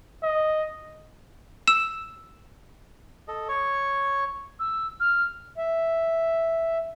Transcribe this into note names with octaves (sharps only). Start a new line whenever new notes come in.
D#5
E6 E7
A4 D#5
C#5 C#6
E6
F6
E5